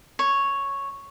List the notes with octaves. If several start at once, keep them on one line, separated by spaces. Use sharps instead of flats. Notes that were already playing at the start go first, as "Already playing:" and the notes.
C#5